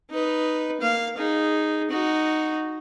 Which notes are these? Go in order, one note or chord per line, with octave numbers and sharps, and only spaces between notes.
D#4 B4
A#3 F5
D#4 G#4
D#4 F#4